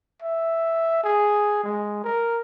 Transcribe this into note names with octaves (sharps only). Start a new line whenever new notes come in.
E5
G#4
G#3
A#4